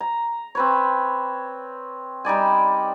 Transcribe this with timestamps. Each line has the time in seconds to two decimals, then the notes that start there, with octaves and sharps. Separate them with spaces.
0.01 A#5
0.55 C4 B4 C#5
2.25 G3 D#4 D5 G#5